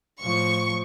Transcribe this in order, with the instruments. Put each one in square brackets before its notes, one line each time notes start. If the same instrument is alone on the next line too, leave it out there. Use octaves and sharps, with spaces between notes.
[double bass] A2 F3 [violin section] C#6